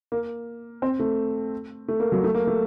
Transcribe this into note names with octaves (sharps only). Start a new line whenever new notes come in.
A#3
C4
A3
A3
A#3
F#3
A3
A#3
A3